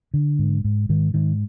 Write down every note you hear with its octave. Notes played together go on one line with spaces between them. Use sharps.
D3
G#2
G#2
G#2 D#3
G#2 D#3